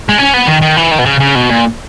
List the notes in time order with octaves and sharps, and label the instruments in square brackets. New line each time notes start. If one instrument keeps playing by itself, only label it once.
[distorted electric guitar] G#3
C#4
B3
D#3
D#3
E3
D#3
B2
C#3
C#3
B2
A#2